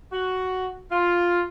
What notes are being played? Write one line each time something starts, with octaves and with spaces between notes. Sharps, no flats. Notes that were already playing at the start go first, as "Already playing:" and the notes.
F#4
F4